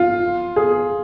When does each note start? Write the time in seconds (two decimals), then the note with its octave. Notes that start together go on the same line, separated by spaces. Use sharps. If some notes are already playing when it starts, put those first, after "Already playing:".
Already playing: F4
0.56 G#4